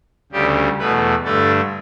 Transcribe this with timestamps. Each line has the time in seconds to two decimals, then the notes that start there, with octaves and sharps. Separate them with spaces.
0.32 D2 C#3 G3 G4
0.78 E2 B2 A3 B4
1.24 G2 D3 A3 A4